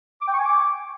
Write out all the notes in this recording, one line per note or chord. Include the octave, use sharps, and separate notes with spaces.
D6
G5
C#6
G#5
D6